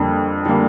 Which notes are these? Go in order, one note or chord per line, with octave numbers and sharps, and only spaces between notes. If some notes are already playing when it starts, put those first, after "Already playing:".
Already playing: F2 D3 G3 A#3
D3 G3 A#3